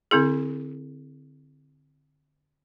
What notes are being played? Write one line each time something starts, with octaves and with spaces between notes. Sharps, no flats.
D3 C4 E4 G#4